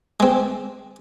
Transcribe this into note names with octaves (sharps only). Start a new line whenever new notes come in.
G#3 C4